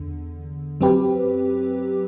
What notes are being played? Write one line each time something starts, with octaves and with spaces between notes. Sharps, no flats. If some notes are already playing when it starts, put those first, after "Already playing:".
Already playing: E2 D3
F#2 F#3 C4 G4 B4